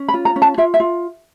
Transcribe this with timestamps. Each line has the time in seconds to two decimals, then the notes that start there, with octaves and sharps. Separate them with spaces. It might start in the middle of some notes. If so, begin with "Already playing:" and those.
Already playing: C#4
0.09 B5
0.14 F4
0.25 A#5
0.36 C#4
0.42 A5
0.58 F4 E5
0.74 E5
0.80 F4